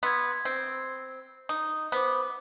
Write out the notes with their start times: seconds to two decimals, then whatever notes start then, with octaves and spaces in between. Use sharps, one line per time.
0.03 B3 C6 E6 G#6
0.45 C4
1.49 D#4 D#6
1.92 B3 C5 D6